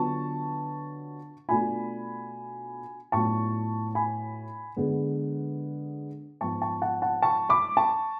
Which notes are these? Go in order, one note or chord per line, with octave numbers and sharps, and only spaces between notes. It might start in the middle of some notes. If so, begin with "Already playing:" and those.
Already playing: D3 F#3 B3 F4 A5 C#6
B2 A3 D4 F4 G#5 B5
A2 F#3 B3 D4 F4 A5 C#6
G#5 B5
D3 G#3 B3
G#2 F3 B3 A5 C#6
A5 C#6
F#5 A5
F#5 A5
A5 C#6
B5 D6
A5 C#6